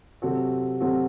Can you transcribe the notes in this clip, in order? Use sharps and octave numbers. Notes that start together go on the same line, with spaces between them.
C3 F#3 C4 F#4 A4
C3 F#3 C4 F#4 A4